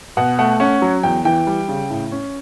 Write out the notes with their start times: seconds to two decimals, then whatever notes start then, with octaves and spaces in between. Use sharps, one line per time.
0.17 B2 F#5
0.38 A3 F#5
0.60 C#4 F#5
0.82 F#3
1.03 E2 G5
1.25 E3 G5
1.47 G3
1.68 C#3
1.90 A2
2.12 C#4